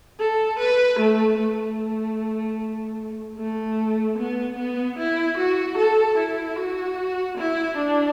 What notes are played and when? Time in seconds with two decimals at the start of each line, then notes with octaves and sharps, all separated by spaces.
0.20 A4
0.60 B4
0.99 A3
1.39 A3
3.38 A3
4.18 B3
4.59 B3
4.98 E4
5.38 F#4
5.78 A4
6.18 E4
6.57 F#4
7.38 E4
7.77 D4